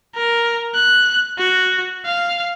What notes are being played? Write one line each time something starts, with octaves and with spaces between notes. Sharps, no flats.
A#4
F#6
F#4
F5